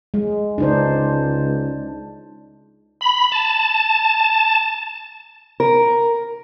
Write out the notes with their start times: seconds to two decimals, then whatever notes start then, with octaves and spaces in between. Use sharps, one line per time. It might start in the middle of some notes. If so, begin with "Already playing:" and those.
0.14 G#3
0.58 C#2 D4 D#4 C5
3.01 B5
3.32 A5
5.60 A#4